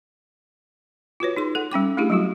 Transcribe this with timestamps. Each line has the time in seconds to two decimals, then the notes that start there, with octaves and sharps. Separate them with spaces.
1.20 F4 F#4 B4 C#5
1.36 D#4 G#4 C6
1.55 A4 F#5
1.72 G3 C#4 G5 D6
1.97 A3 D4 E4 G4 G#4
2.10 F#3 G3 E4 F#4